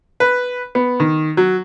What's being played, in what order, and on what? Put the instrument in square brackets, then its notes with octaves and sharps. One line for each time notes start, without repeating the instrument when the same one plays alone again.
[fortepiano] B4
B3
D#3
F#3